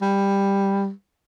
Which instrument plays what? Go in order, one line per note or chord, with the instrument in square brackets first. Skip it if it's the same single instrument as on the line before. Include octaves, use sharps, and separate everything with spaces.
[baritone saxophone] G3